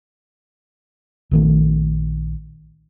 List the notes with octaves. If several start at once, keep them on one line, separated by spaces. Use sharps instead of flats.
A#1 D#3 A3